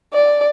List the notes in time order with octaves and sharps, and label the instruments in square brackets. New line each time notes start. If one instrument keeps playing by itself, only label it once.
[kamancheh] D5